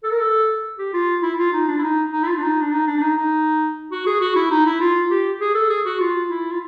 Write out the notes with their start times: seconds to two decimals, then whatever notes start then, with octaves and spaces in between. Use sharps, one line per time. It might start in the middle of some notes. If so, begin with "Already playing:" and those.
0.04 A4
0.11 A#4
0.19 A4
0.79 G4
0.93 F4
1.23 E4
1.38 F4
1.53 D#4
1.67 D4
1.78 E4
1.83 D#4
2.12 D#4
2.23 E4
2.27 F4
2.38 D4
2.42 D#4
2.61 D4
2.72 D#4
2.87 D4
2.97 D4
3.02 D#4
3.17 D#4
3.91 F#4
4.06 G#4
4.21 F#4
4.36 E4
4.51 D#4
4.66 E4
4.80 F4
5.11 G4
5.41 G#4
5.55 A4
5.70 G#4
5.85 F#4
6.00 F4
6.30 E4
6.51 F4